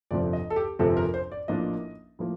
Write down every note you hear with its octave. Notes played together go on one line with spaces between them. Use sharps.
G1 F2 C3 F3 C4 D5
D#5
A4
G4
G1 F2 C3 F3 C4 A4
A#4
C5
D5
A1 A2 F3 A#3 D4 D#5
A2 F3 A#3